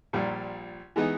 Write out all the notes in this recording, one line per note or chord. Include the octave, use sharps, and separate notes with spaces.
A#1 A#2 G3
E3 G#3 B3 D#4